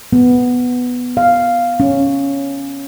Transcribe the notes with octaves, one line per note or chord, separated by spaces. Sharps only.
B3
F5
C#4